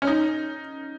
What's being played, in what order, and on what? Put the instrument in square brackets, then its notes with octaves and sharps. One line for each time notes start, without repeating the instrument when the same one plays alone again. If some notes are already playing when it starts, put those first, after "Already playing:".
[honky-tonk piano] C#4
D#4